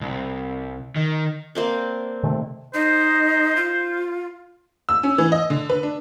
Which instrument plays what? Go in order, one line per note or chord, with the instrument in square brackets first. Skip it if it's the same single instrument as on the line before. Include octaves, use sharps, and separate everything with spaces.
[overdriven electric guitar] C2
D#3
[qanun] A#3 C4 D4
[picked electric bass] C3 D#3 A3
[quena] D#4 [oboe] C5
[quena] F4
[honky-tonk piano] E6
C#4
E3
D#5
D3
B4
D4